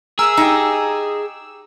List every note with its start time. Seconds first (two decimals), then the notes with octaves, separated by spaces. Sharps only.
0.19 G#4 A#4 E5 E6
0.37 D#4 G4 G#5 A5